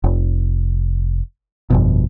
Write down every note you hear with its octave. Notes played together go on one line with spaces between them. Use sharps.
F1
G1 F2 B2